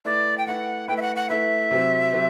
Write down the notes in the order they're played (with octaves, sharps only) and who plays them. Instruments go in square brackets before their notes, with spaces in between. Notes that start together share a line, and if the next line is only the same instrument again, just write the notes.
[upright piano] A3 E4 B4 [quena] D5
[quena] G5
[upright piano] A3 E4 B4 [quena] F#5
[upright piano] A3 E4 B4 [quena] G5
[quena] E5
F#5
F#5
[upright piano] A3 E4 B4 [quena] E5
[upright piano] C3 F#3 C4
C3 F#3 C4